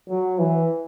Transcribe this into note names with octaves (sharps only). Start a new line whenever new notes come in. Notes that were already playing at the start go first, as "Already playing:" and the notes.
F#3
E3